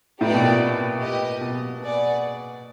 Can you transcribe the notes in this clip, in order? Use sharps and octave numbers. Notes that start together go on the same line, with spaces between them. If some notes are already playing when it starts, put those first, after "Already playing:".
A2 D#4 G4 B4 D5 G5
B2
A#2
G4 B4 D#5
B2
G#4 B4 D5 F#5